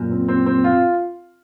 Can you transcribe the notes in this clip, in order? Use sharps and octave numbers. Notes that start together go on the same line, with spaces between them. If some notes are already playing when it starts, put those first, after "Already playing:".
Already playing: F#2 A#2
C4
C4
C4
F4